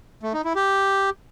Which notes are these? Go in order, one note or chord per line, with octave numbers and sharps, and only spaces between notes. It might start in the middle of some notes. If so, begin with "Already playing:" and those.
A3
D#4
E4
G4